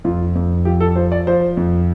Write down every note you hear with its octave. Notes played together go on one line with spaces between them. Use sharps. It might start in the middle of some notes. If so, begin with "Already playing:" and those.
F2 F4
F2
F3 G4
A4
F3 C5
D5
F3 C5
F2